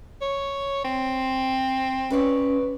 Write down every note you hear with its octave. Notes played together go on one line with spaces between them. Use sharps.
C#5
C4
C#4 B4 C#5 D5